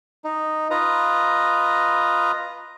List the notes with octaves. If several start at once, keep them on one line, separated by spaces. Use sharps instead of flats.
D#4
F4 B4 D#5 A#5